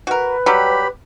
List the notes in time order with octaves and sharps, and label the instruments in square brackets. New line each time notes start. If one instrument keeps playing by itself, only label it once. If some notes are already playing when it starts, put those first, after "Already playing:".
[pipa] F#4 A#4 [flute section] B4
[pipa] F#3 G3 [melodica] G4 B5